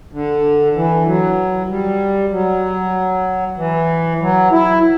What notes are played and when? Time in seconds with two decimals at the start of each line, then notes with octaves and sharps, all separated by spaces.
0.12 D3
0.75 E3
1.06 F#3
1.69 G3
2.31 F#3
3.57 E3
4.20 F#3
4.51 E4